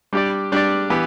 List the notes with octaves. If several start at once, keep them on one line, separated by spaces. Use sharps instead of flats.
G3 D4 G4 D5
G3 D4 G4 D5
E3 B3 G4